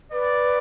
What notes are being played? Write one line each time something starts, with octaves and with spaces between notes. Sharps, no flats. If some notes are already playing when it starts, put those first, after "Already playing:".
B4 D5